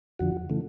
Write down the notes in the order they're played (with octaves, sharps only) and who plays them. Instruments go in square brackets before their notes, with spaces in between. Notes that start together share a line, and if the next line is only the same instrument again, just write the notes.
[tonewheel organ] F2 D3 F3 F#4
C#3 E3 A3